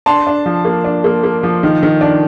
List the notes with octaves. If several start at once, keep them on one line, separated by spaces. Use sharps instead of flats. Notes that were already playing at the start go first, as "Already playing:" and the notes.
D4 A5 C6
D4
F3
A#3
D4
A#3
A#3
F3
D#3
D#3
D4